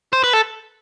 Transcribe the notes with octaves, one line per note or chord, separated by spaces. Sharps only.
C5
B4
A4